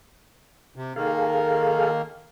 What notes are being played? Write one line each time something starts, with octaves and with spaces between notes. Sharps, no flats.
C3
D#3 A#3 G#4 A4 F5